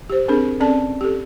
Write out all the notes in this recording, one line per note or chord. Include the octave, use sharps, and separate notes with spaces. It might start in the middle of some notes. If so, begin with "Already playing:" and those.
G4 C5
C4 D4 G#4 A#4
C4 C#4 A4 D5 A5
G4 A4